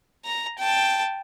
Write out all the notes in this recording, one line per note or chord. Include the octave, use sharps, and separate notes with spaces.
A#5
G5 A5